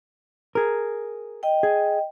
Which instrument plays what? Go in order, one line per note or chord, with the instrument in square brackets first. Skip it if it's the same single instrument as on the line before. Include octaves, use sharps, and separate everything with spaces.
[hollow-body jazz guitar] G#4 A#4
[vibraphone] D#5 G5
[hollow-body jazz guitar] G#4